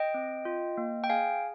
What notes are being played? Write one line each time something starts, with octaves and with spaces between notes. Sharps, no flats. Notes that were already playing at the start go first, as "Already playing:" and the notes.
Already playing: D#5 G5
C4
F4
A#3
G5
G#4 F5 G#5